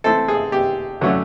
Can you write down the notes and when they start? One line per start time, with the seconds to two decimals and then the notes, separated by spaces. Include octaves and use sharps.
0.04 E3 A3 C4 A4
0.28 G#4
0.52 G4
1.01 D3 F#3 A3 C#4